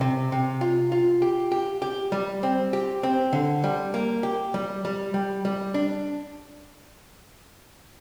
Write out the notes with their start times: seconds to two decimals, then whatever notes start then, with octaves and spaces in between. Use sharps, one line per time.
0.01 C3
0.32 C3
0.61 F4
0.92 F4
1.22 G4
1.52 G4
1.82 G4
2.12 G3
2.43 C4
2.73 G4
3.03 C4
3.33 D3
3.64 G3
3.94 A#3
4.23 G4
4.54 G3
4.85 G3
5.14 G3
5.45 G3
5.74 D4